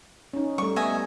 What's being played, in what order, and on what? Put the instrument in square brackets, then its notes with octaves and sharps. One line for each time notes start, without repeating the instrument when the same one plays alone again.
[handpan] C#4 D#4
[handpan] G3 A3 [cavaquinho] C#6
[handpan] B3 [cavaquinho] D#5 E5 G#5